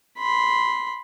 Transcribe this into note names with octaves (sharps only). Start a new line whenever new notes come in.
B5 C6